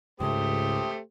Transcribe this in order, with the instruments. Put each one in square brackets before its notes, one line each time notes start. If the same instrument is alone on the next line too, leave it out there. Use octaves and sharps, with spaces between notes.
[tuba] C#2 [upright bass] G#2 C#3 [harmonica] A3 G4 C5 [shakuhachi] D#6